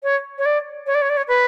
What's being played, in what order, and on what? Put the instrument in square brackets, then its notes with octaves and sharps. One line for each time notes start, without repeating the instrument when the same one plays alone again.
[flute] C#5
C#5
D5
C#5
D5
C#5
D5
C#5
B4